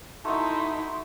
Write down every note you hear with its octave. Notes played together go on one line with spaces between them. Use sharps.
A3 D#4 E4 F#4 A5 C6